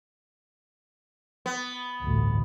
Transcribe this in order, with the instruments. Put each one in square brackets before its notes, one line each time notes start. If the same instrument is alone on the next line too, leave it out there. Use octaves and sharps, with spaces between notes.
[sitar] B3
[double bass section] A1 D2 G2